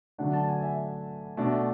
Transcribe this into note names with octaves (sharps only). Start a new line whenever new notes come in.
D3 F#3 A3 D4 F#5
A5
G#5
E5
B2 A3 D4